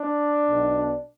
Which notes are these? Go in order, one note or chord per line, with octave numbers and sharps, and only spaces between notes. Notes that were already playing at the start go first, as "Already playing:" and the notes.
Already playing: D4
B1 B2